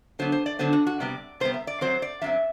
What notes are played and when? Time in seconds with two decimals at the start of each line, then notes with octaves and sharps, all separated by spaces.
0.19 D3 F#3 B3 C5
0.32 C5
0.46 D5
0.59 D3 F#3 B3 C5
0.73 F#4
0.87 F#4
1.00 C3 G3 B3 D5
1.40 C3 G3 B3 C5
1.54 E5
1.67 D5
1.81 F#2 F#3 C4 C5
2.02 D5
2.21 F#2 F#3 C4 E5